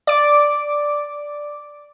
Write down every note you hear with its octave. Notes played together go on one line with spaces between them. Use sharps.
D5 D6